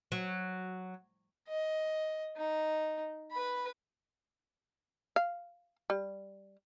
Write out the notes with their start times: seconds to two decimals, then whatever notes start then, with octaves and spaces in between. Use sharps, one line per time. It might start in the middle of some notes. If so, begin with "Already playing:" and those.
0.12 F#3
1.48 D#5
2.37 D#4
3.32 B4 B5
5.16 F5
5.90 G3